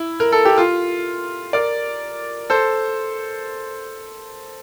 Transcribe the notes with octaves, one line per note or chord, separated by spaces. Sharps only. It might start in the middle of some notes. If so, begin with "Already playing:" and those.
Already playing: E4
A#4
A4
G4
F4
A#4 D5
A4 C5